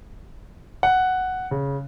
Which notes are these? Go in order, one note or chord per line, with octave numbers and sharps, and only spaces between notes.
F#5
C#3